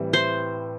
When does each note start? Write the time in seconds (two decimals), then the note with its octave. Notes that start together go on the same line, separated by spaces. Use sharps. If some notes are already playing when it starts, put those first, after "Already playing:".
Already playing: A2 E3 G3 C4
0.13 C5